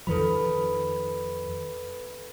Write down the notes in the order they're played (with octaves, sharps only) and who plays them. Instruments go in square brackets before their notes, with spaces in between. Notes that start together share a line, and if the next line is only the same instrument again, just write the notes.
[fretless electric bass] F2 D#3 F3 [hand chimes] A4 B4 B5